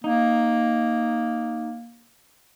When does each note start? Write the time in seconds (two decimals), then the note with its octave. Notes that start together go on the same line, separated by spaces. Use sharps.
0.04 A#3 D#4